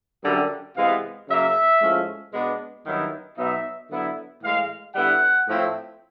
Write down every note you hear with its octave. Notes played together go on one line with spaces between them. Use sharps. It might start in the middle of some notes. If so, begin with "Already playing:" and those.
F#2 D3 G3
C3 E3 G#3 B3 F5
C#3 F#3 A#3 E5
A2 F3 G#3 C#4
B2 G#3 B3 D4
G2 D#3 F#3 B3 E4
B2 F#3 B3 D#4 E5
D3 F#3 B3 E4
A2 E3 G#3 F5
D3 G3 B3 E4 F#5
A2 F3 A3 C4 E4